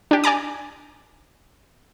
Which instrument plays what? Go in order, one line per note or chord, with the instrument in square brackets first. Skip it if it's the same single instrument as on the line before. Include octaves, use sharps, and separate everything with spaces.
[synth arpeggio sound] D4 G4
D5 G#5 A#5 D6